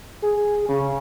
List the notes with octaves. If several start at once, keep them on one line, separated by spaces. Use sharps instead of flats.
G#4
C#3